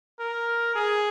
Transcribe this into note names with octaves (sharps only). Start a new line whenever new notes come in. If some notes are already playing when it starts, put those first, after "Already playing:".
A#4
G#4